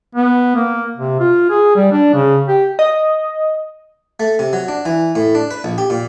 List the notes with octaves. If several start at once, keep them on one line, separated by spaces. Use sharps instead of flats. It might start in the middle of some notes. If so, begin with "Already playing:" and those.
B3
A#3
C3
F4
G#4
G3
D4
C#3
G4
D#5
A3
C3
F#3
D4
E3
A2
D4
B4
A#1
G4
A#2